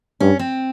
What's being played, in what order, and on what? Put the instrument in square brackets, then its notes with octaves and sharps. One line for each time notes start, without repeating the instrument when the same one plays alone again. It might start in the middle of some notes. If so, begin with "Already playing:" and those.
[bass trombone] G2 [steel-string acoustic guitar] C#4
[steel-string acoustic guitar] C4